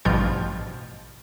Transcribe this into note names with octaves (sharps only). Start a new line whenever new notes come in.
A1 G2 B2 F3 F4 G6